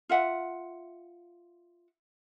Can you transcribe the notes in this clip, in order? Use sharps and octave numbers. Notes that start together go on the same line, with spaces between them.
F4 E5 F#5